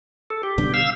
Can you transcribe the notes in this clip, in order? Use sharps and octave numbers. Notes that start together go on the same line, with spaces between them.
A4
G4
B2 D3 G3
F5 E6